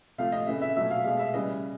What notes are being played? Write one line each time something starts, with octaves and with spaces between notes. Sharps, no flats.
C3 F3 A3 F5
D#5
C#3 E3 A3 E5
E5
B2 F#3 A3 E5
F5
B2 G#3 F5
E5
C#3 E3 G3 D#5